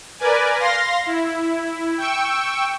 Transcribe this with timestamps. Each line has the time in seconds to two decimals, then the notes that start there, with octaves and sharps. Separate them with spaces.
0.19 A#4 B4 D5 G#5
0.60 F5 C6 A#6
1.06 E4
1.98 G5 C#6 E6